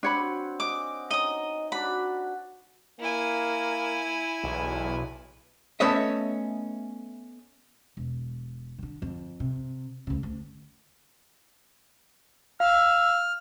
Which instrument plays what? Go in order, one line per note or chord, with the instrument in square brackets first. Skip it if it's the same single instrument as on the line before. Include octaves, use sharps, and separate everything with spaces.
[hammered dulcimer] C4 F#4 [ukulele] D4 C#5 B5
[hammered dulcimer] D#5 F#5 G#5 [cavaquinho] D6
[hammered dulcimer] C#4 D#4 [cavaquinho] D#5 D#6
[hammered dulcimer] D4 F#4 [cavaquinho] B5
[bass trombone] A#3 [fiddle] E4 G#5
[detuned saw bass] B1 [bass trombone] E2
[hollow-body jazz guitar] A3 B3 C#4 D#5 E5
[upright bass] E1
D3 D#3
F2
C3
D2 C#3
D2
[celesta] F5 [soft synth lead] E6 [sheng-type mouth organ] F6